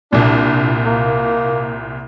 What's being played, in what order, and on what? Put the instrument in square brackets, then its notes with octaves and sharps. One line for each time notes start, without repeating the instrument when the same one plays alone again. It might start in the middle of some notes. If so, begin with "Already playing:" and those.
[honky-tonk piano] C2 A#2 [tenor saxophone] D4
[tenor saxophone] A#3